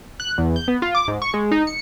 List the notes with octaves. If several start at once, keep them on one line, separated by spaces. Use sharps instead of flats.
F#6
E2
G6
B3
F4
D6
G#2
C#6
G#3
D#4
C#7